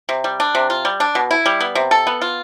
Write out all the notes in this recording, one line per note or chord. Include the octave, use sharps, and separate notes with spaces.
C3
G3
D4
C3
F4
G3
D4
B2
E4
G3
B3
C3
A4
B3
F4